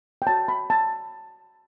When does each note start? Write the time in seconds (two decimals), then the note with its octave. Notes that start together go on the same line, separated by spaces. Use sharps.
0.22 G5
0.26 F#4 C#5 A5
0.48 B5
0.70 A5